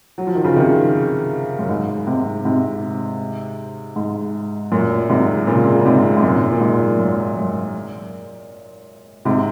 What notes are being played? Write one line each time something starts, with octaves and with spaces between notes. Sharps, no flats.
F#3
F3
D#3
C#3 F3
C3 D#3
F#2
G#2
G#2 C3
G#2 C3
G#2
F#2 A#2
G#2 C3
A#2 C#3
C#3
G#2 C3
G#2
F#2 A#2
A#2
G#2
F#2
F#2
G#2 C3